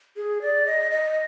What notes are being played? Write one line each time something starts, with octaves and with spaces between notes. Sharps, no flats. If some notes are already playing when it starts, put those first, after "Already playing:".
G#4
D5
D#5
D#5